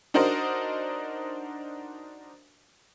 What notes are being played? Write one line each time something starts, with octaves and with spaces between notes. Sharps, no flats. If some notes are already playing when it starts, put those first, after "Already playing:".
D4 D#4 F#4 A#4 C5 D#5